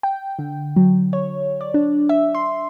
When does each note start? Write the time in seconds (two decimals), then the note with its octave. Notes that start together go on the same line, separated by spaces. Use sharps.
0.03 G5
0.39 D3
0.76 F#3
1.13 C#5
1.61 D5
1.74 D4
2.09 E5
2.35 C6